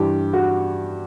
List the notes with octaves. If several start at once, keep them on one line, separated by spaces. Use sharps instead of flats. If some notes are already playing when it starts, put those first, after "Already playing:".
Already playing: G2 E3 G4
F#4